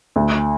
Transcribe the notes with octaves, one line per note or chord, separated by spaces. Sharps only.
D2